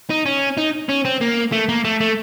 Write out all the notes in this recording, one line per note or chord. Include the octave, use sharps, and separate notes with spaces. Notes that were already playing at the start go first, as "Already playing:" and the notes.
D#4
C#4
D#4
C#4
C4
A#3
A3
A#3
A3
A3